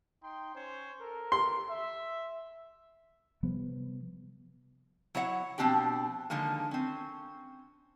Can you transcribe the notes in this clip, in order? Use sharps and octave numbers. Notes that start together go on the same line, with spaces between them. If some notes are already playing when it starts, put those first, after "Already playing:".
D#4 G5 C6
C#4 C5 C#5
A4 A#4
C6
E5
C3 F3 G3 B3
F#3 E4 C#5 D#5 F#5
B2 F3 C4 D4 G4 G5
D3 D#3 F3 G#3 A#3
C4 C#4